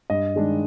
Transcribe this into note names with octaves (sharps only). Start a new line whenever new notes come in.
G2 D#5
D#3 G#3 D4